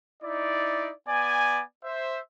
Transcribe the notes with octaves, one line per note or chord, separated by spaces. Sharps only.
D#4 E4 D5
B3 D5 G#5
C5 E5